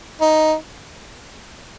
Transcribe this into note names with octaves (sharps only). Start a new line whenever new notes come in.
D#4